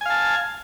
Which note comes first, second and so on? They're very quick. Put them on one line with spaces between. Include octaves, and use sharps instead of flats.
G#5 F5 A5